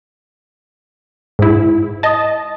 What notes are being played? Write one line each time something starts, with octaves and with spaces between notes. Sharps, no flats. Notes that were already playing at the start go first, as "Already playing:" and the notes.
G#2 E4
D#5 A5